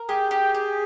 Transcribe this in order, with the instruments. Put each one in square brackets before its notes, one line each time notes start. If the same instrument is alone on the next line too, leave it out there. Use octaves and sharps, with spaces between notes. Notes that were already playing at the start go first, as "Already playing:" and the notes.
Already playing: [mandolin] A#4
[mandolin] G4 [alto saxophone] G#4
[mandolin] G4
G4